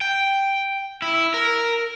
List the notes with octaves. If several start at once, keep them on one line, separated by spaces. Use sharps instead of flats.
G5
E4
A#4